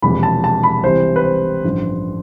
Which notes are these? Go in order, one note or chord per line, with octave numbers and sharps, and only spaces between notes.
E1 E2 C3 F3 B5
A5
A5
B5
C2 C3 E3 C5
B4
C5
A1 G2 D3 F3